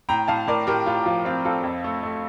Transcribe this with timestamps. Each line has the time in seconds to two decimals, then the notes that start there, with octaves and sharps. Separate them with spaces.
0.09 A2 G5 A#5
0.28 A2 F5 A5
0.47 A2 A#4 D5
0.67 A2 G4 A#4
0.86 A2 F4
1.06 F3 F4
1.25 C4 F4
1.45 C4 F4 A4
1.64 F2
1.84 A3
2.03 A3